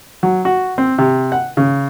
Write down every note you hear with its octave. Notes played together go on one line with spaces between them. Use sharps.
F#3
F#4
C4
C3
F#5
C#3